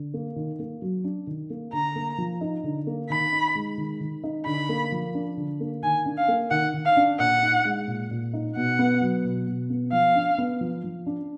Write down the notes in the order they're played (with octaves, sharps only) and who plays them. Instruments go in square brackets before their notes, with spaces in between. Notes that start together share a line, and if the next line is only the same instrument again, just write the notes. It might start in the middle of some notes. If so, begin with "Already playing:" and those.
Already playing: [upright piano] D3
A#3
D#3
A#3
F#3
D4
D#3
A#3
[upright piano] D3 [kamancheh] A#5
[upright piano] A#3
F3
D#4
D3
A#3
[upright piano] D#3 [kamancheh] B5
[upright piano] D#4
G#3
D#3
D#3
D#4
[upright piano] D3 [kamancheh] B5
[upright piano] A#3
F3
D4
D3
A#3
[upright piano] D#3 [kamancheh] G#5
[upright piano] D4
[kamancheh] F5
[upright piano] A#3
[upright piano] D#3 [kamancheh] F#5
[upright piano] D#3
[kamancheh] F5
[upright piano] D4
[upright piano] A#2 [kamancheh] F#5
[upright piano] D#4
G#3
A#2
A#2
D#4
[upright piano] B2 [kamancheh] F#5
[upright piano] B3
F#3
B2
B2
B3
[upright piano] F3 [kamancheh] F5
[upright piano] D4
B3
F3
F3
D4